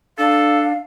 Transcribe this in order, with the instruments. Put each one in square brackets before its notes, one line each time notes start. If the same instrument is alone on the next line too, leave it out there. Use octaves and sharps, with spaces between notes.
[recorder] D4 [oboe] A4 [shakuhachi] F5